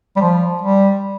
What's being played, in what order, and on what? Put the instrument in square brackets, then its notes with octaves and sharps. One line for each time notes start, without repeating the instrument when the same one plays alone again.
[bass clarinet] G3
F3
G3